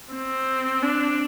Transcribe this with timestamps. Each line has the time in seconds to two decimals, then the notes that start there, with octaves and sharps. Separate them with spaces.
0.12 C4
0.82 D4